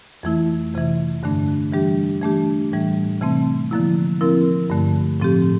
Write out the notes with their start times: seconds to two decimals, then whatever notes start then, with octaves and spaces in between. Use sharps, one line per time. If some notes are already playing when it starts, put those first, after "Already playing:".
0.23 F2 E3 A3 E4
0.74 F2 C3 E3
1.23 G2 D3 A3 D4
1.73 E3 G3 D4 G4
2.22 E3 A3 D4 G4
2.72 A2 E3 G3
3.21 C3 E3 A3 C4
3.71 D3 F3 A#3 E4
4.21 F3 C4 E4 A#4
4.70 G2 D3 A3
5.20 A2 F3 C4 G4